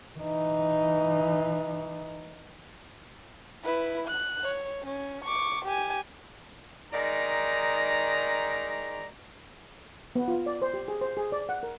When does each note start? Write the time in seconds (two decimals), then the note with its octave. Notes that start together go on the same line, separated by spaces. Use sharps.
0.19 E3 D#4
3.64 E4 B4
4.08 F#6
4.43 C#5
4.83 C#4
5.24 C#6 D6
5.65 G4 G#5
6.92 G#2 D#3 D5 A#5
10.16 B3
10.28 F4
10.46 D5
10.62 C5
10.74 G4
10.88 G#4
11.01 C5
11.17 G#4
11.32 D5
11.49 F#5
11.63 A#4